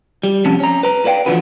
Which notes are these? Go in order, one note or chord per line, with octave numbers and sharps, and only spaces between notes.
G3
C3 F3 C#4 A5
C#4 A#5
B4 A#5
B4 D5 F5 G5
D3 E3 F3 D4 F#4 B4